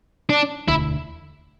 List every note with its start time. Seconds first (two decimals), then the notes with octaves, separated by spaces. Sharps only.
0.29 D4
0.68 E1 D2 D3 E4